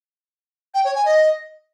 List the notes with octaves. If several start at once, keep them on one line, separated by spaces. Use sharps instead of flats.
G5
C#5
G#5
D#5